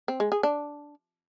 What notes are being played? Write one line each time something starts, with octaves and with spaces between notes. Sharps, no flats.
C4
G#3
G#4
D4